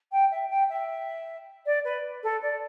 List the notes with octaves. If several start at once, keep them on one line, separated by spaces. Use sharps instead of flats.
G5
E5
G5
E5
D5
B4
A4
D5